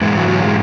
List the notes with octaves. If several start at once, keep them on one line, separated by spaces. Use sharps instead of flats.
G#2 E3 G#3
F#3
F#3
G#3